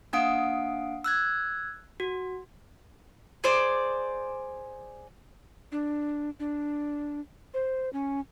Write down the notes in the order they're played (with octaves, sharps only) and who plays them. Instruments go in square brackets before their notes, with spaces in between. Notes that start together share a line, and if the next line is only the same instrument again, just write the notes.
[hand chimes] A#3 D4 F5 F#5 D#6 D7
E6 F#6 G#6
F#4
[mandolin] G#4 C5 D5
[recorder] D4
D4
C5
C#4